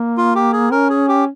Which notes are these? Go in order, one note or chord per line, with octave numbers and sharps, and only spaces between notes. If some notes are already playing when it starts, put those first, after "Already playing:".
Already playing: A#3
F4
G4
G#4
C#4 A#4
G#4
G4